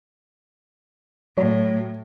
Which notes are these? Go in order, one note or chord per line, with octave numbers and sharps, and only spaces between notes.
A2 F#3 C#5